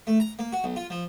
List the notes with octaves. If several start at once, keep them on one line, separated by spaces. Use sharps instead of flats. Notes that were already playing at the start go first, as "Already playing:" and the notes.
A3
A#5
A#3
F#4
B1
F4
F3